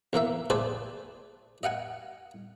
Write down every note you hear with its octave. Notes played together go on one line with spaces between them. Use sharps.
B1 E3 A#3 E5
G#4 B4 C5 D5 G#5 A5
D#5 F5 F#5 G#5